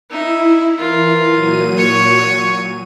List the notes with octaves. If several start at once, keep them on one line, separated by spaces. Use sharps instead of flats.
D#4 E4 E5
E3 F4 A#4
A#2 F#3 D#7
C#5 C#6